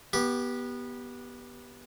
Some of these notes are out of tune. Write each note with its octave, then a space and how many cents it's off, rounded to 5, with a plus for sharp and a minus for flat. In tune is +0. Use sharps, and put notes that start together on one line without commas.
B3 -20 G4 +0